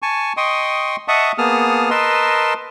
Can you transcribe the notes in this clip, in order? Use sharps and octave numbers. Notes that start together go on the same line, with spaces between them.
G#5 A5 C#6
D#5 G5 C6 C#6 D#6
D#5 E5 F#5 A5 C#6 D#6
A#3 B3 G#4 A5 D#6 F6
A#4 B4 D#5 A5 C6 E6